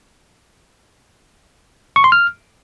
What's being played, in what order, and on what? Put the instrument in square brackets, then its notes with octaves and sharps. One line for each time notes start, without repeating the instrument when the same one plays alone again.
[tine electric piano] C#6
C6
F6